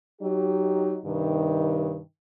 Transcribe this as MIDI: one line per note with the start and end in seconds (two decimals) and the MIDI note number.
0.21 0.98 54
0.21 0.98 63
0.21 0.98 67
1.05 1.99 43
1.05 1.99 48
1.05 1.99 51